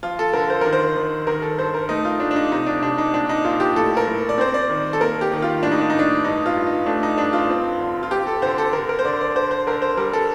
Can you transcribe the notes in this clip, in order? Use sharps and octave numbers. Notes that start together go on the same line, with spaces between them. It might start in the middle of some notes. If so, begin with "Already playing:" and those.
F3 F4
A4
D3 A#4
C5
D#3 A#4
C5
D#3
D#3 A#4
A4
G2 C5
A#4
A3 D#4
F4
A3 D4
D4
D#4
C3 D#4
D4
C3 D4
D#4
A#2 D4
D#4
A#2 F4
G4
A2 A4
A#4
A2
D5
C4 C5
D5
D#3
A4
A#3 A#4
G4
D#3
F4
A2 D4
D#4
D4
A2 D#4
D4
G2 D#4
F4
G2
D#4
A3 D4
D#4
G2 D4
F4
C4
D3
F4
C4 G4
A4
D3 C5
A4
D3 A#4
A#4
C5
D3 D5
D5
D3 C5
C5
D3 A#4
C5
G3 A#4
A4